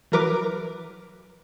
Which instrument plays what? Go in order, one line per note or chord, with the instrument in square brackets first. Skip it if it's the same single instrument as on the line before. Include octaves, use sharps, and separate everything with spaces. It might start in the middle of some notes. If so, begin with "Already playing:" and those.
[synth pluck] E3 F#3 A#4 B4 D6